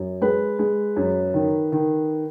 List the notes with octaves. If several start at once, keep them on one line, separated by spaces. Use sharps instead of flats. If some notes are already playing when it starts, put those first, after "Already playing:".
Already playing: F#2
G#3 B4
G#3
F#2
D#3
D#3